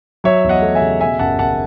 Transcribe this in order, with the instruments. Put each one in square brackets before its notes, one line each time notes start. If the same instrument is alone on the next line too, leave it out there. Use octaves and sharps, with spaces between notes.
[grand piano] F#3 C#5 E5
E2
D#5 F#5
A3
E5 G#5
C#3
B2 E5 G#5
F#1 F#5 A5
F#1 F#5 A5